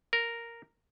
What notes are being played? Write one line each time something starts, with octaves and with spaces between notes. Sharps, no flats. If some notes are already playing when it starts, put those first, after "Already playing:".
A#4